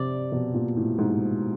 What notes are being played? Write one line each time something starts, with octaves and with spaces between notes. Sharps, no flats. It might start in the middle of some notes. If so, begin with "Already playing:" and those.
Already playing: C3 D5
B2
A#2
A2
G#2